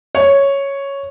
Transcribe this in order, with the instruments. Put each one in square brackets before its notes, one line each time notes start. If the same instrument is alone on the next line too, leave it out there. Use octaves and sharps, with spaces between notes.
[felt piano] C#5